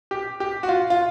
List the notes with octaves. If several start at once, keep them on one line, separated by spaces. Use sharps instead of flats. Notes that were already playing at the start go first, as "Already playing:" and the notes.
G4
G4
F#4
F4
F4